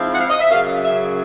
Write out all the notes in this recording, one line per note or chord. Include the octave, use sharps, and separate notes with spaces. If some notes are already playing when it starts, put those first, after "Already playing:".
Already playing: G#2 F3 C4 E4
F#5
F5
D#5
E5
F#2 C#3 F#3 F5
E5